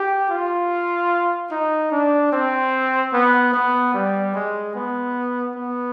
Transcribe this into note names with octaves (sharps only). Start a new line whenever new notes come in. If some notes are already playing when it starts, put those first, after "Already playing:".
Already playing: G4
F4
D#4
D4
C4
B3
B3
G3
G#3
B3
B3